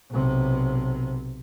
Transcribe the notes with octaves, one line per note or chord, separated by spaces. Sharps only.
B1 C3